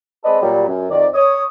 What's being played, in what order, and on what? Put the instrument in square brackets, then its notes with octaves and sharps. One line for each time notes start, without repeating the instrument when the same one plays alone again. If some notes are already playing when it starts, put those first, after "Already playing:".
[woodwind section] G#3 C4 A4 B4 D5 D#5
A#2 F#3 G3
F#2
F2 D#3 D5
C#5 D#6